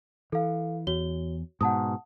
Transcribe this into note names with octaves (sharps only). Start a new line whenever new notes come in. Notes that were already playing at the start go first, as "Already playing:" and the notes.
E3 A4 F5
E2 F#4 C#5 G7
G#2 B2 F#5 A5 D#6